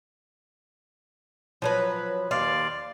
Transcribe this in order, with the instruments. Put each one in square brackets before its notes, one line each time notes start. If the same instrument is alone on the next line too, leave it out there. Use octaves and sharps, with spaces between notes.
[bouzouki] F3 F#3 B4
[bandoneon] D#2 D5 C6 [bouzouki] F5